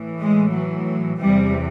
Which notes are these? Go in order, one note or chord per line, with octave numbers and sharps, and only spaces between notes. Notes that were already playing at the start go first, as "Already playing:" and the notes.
Already playing: A2 E3
G#3
F#3
E2 C3 E3 G3